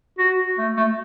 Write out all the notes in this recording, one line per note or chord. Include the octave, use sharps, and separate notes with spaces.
F#4
A3
A3